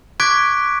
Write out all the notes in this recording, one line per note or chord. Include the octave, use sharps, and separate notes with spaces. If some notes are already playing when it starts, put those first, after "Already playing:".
C#6 D6 F#6 G#6 B6 D7